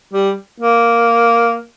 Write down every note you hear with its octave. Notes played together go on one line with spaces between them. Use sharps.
G3
A#3